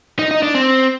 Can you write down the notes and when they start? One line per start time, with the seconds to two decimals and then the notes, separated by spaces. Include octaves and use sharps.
0.19 D#4
0.31 D#4
0.43 D4
0.55 C4